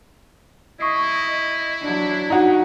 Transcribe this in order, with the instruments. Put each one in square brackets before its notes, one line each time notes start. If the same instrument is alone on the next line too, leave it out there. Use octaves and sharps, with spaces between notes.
[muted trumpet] E4 [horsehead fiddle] D#5 [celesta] C#6 D#6 C7
[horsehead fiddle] F#3 D4
[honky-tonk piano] D#4 F#4